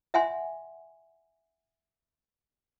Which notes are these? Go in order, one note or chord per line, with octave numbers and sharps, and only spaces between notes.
E5 F#5 G#5 C6